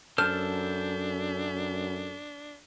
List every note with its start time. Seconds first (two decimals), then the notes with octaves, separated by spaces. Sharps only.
0.18 F#2 D4 A4 C5 A5 F6